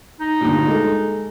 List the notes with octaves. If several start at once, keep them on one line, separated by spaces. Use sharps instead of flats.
D#4
D2 G2 A#2
G#3 A4